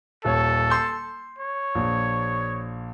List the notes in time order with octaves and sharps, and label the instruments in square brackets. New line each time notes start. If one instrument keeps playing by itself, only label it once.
[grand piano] D#1 C#5 [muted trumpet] A4
[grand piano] C6 G6
[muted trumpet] C#5
[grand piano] A#1